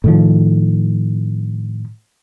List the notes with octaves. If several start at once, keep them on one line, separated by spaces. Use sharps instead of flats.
A2 D#3 F3